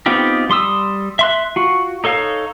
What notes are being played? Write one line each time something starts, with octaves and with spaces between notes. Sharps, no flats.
B3 C4 D#4 F4 G4
G3 C6 D#6 E6
E5 C6 F#6
F4 F#4
D#4 A4 C#5 F5